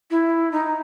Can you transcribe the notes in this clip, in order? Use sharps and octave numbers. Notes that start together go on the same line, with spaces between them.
E4
D#4